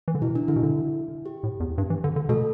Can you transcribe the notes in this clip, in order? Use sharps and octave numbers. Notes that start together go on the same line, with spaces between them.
E3
D3
B2 E4
D4
D3 E4
B2
D3
G4
A2
E2
G2
E3
D3
D3
B2 A3 A4